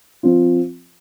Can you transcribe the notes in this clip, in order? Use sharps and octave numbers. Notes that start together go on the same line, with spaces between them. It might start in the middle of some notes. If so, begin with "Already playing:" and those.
F3 C4 F4